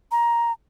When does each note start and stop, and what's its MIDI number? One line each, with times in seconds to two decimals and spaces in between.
0.11 0.52 82